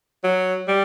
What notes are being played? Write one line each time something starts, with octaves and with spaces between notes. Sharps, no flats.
F#3
G3